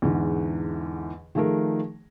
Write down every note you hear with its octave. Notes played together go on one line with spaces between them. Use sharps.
E2 G#2 D3 E3
D#3 F3 A3 G#4 A#4